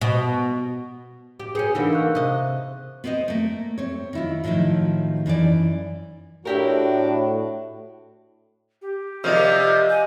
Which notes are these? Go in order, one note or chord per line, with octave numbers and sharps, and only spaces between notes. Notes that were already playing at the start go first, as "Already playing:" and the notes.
B2
G4
C#4 G#4 B4 G6 C#7
D3 E3 A#3 D#4 G#4 A#4
F5 C#6 F#6
C3 D#5
B3 C4 C5 D5 D#5
A3 A#3
C4 C#5
D#3 E4 F4
A2 D#3 F3 F#3 E4
F#2 E3 D#4 D5
A2 D4 E4 F#4 G4 A#4
G4
C3 F3 A#3 D5 D#5 F5 G6
G#5